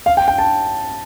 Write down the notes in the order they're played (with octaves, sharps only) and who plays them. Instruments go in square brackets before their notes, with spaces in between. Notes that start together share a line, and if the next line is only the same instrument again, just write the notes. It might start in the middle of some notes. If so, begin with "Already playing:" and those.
[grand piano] F5
G5
G5
A5